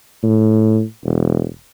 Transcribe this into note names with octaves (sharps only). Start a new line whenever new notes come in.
A2
E1